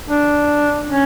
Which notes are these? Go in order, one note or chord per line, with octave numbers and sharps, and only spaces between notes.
D4
C#4